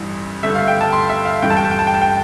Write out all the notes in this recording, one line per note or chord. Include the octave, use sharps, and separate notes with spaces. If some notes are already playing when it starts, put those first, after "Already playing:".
Already playing: A1 G2 E3
G1 G2 D3 A3 E5
F5
G5
A5
C6
E5
F5
G2 E3 A3 C4 G5
A5
G5
A5
G5
A5
G5
A5
G5